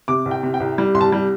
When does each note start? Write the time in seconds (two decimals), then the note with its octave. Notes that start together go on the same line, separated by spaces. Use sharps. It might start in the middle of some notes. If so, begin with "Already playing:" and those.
0.08 C3 D6
0.26 C2
0.31 G5
0.43 C3
0.54 G5
0.60 C2
0.78 G3
0.94 C2 C6
1.01 A5
1.12 G3